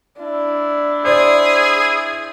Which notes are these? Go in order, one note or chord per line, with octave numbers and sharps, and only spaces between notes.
D4 E4
G#4 C5 D5